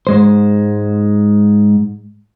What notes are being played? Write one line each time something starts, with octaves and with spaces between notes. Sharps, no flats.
G#2 G#3 C5